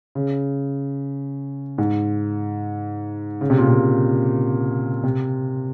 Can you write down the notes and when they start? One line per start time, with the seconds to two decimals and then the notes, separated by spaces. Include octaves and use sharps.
0.15 C#3
1.78 G#2
3.41 C#3
3.50 C3
3.58 A#2
3.68 C3
5.04 C3